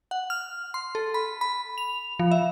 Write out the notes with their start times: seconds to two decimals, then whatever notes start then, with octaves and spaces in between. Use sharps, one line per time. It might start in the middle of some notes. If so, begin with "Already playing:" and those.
0.11 F#5
0.30 F6
0.74 C6
0.95 A4
1.14 B5
1.41 B5
1.78 F7
2.19 F3
2.31 E5